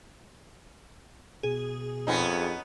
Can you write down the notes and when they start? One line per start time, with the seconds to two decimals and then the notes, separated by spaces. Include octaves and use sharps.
1.43 B2 G#4
2.07 F2 B3 C#4 D#4